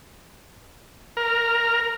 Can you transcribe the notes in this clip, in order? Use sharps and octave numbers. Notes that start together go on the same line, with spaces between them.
A#4